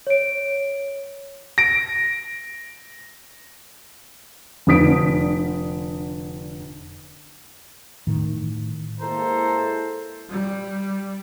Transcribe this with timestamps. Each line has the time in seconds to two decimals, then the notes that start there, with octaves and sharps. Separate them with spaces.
0.07 C#5 D7
1.58 A#6 D7
4.67 F1 D3 D#6 B6 D7
8.07 A2 D#3
9.00 G#3 A#3 E4 A4 C5 A#5
10.30 G3